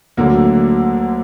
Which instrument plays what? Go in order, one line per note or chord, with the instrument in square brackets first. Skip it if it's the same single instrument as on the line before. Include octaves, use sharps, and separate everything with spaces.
[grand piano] D2 D3 F#3 A#3